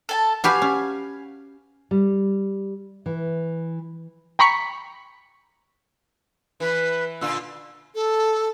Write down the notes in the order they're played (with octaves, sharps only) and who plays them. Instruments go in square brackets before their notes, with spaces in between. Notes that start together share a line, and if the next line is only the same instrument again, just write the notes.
[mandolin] A4 G#5 A5
[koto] F#4 G4 B4 [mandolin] F5 G#5
[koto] C#4
[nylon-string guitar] G3
E3
[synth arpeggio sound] G5 A#5 B5 C#6 B6 C#7
[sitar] E3 [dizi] B4
[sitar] A#2 D3 F4 [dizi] E6
[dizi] A4